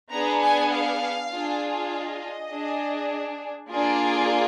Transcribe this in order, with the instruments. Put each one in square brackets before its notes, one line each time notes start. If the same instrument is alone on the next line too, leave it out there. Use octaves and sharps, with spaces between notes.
[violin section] B3 D4 G#4 A#5
G#5
F5
D4 F4 G#4
D#5
D4 G#4
A#3 D4 F4 G#4 D5